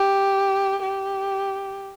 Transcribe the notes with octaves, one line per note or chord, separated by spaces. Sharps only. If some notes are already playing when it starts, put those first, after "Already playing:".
Already playing: G4
G4